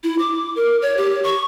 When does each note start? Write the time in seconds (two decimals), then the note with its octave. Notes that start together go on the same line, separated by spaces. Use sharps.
0.04 E4
0.18 D6
0.56 A#4
0.82 C#5
0.97 G4
1.24 C#6